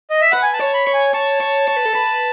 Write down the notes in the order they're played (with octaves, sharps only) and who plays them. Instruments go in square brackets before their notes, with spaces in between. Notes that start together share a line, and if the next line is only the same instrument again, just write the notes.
[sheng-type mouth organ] D#5
E5
[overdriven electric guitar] B4 [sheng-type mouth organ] F#5
[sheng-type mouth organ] G#5
A5
[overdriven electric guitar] C#5
[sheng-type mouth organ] B5
[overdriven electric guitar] C#5
[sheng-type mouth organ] G#5
[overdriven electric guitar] C#5 [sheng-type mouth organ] A5
[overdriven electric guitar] C#5
C#5
B4
A4
B4